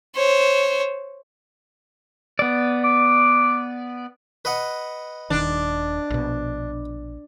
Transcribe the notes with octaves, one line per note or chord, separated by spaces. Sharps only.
C5 C#5
B3 D5
D6
B4 D#5 F#5
D#1 D#3 D4
A#1 B2